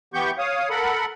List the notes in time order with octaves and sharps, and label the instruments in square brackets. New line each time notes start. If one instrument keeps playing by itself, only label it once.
[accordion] E3 B3 G4 C#6 G6
C#5 F5 D#6
A4 A#4 F#5 B5